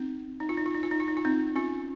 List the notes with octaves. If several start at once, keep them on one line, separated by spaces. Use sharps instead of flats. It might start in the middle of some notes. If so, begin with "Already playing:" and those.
Already playing: C4 D#4
D#4
F4
D#4
F4
D#4
F4
D#4
F4
D#4
F4
C4 D#4
C#4 F4